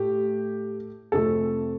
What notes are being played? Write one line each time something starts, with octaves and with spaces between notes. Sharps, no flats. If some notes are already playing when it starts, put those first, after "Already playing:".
Already playing: A2 A3 G4
F2 C3 F3 A3 A4